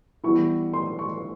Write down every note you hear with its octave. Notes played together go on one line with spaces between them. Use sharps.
E3 G3 B3 E4 C#6
C6
C#6